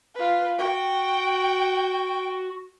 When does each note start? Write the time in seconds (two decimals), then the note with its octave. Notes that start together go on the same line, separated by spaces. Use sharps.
0.15 F4 B4
0.58 F#4 G5